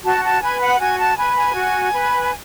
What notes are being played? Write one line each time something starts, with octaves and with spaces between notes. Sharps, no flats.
F#4 A5
A5
B4 G#5
F#5
F#4 G#5
A5
B4 G#5
G#5
F#4
B4